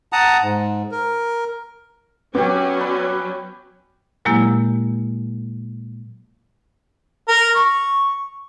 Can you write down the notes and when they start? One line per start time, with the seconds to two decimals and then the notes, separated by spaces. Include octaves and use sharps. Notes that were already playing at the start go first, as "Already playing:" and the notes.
0.13 F#5 A5 A#5 D#6
0.42 G#2
0.91 A#4
2.35 F#3 B3 C#4 G4 D6
2.77 B4 D5
4.25 A#2 F#3 G#3 A#3 E4 G4
7.28 A#4
7.56 C#6